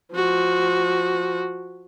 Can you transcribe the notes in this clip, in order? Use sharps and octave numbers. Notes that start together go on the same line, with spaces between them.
F3 F#4